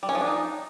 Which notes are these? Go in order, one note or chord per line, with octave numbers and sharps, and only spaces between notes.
G3
C#4
F3
D4
D#4